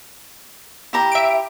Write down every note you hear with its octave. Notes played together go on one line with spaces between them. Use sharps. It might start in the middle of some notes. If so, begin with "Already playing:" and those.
E4 G4 A#5
E5 D7